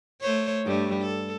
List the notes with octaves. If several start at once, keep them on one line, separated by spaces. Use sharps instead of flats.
A3 C5 C#5
G2 G3 A3
A4